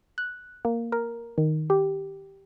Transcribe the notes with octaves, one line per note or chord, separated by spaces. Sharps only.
F#6
A#3
A#4
D#3
G4